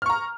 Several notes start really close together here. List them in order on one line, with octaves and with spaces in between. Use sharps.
F6 C#6 A#5